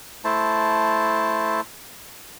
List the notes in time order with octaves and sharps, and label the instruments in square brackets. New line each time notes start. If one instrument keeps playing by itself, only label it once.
[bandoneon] A3 E4 C5 A5